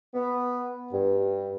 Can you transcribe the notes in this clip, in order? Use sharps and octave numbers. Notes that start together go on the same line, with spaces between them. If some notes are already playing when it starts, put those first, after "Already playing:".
B3
G2